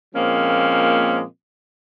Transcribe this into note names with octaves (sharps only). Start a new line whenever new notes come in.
A#2 F3 G#3 A#3 C4 C#4